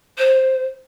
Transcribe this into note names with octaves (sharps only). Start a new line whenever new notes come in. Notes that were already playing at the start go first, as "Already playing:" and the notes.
C5